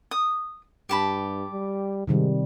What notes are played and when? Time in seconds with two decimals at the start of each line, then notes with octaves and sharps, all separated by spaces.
0.11 D#6
0.89 G2 G4 A5 B5
1.51 G3
2.07 G#2 C3 D#3 G3